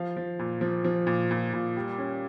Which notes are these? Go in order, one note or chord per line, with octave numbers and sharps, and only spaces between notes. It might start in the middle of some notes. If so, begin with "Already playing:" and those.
Already playing: F3 F5
F3
A#2
F3
F3
A#2
A#2
A#2
G3
C#4